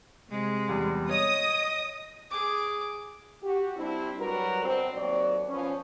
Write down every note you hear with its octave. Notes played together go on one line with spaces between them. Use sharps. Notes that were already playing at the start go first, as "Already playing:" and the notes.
C3 G#3
E2 G3
C#5 D#5 D#6
G#4 D6
F#4 G4
G3 C4 D4 E4
F#3 G3 F#4 A#4 B4
B2 D3 C4
D#2 F#3 C4 D5
F3 B3 C#4